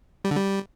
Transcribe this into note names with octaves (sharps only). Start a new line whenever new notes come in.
G3
D3
G3